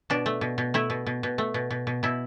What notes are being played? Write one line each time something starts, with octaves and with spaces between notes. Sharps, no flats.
B2 D4
A3
B2
B2
A3 E4
B2
B2
B2
A3
B2
B2
B2
B2 E4